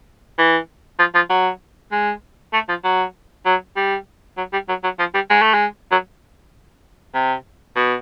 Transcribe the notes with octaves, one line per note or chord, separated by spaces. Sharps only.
E3
F3
F3
F#3
G#3
A3
F3
F#3
F#3
G3
F#3
G3
F#3
F#3
F3
G3
G#3
A3
G#3
F#3
C3
B2